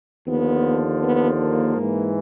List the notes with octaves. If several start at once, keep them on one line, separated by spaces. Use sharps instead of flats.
D#2 D3 F3 B3
B3
A#3
G#2 E3